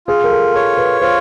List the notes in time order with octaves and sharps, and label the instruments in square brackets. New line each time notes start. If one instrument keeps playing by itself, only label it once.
[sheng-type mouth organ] F4 [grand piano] G#4
[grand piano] A#4
A4
[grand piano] A4 [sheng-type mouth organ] C#5
[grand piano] B4
[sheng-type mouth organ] F4 [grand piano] C5